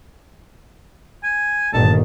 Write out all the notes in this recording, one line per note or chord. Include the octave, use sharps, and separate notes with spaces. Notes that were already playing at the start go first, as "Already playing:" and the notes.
G#5
G1 A#2 D#3 A5